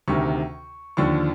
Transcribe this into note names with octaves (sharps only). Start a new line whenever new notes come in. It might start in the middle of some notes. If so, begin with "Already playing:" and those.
D2 C3 D#3 C#6
D#2 D3 F3 C#6